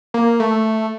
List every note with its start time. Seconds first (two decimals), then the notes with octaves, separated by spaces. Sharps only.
0.14 A#3
0.40 A3